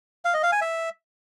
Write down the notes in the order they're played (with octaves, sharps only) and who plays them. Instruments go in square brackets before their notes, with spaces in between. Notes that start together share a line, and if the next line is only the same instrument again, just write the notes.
[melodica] F5
D#5
F5
G#5
E5